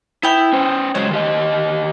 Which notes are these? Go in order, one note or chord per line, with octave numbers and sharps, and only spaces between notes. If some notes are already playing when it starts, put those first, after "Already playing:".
B3 E4 G5
C#4 C5
F#3 G#3 C5 C#5
D#3 G4 D#5